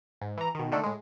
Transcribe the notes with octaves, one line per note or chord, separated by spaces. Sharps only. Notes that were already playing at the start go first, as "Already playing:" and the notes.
G#2
E3 A#5
B2 D#3
D3 D#3 A3 D4 A4
A2 G#3